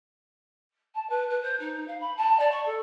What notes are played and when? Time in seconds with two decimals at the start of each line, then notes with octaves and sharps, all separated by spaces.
0.94 A5
1.09 B4
1.29 B4
1.42 C5
1.59 D#4
1.87 F5
2.00 B5
2.16 A5
2.39 D5
2.51 C#6
2.65 A4